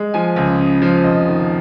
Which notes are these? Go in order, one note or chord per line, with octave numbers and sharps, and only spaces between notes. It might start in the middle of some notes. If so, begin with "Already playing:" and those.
Already playing: G#3
F3 G#5
C#2
C#3
F3
F1 D#5
D#3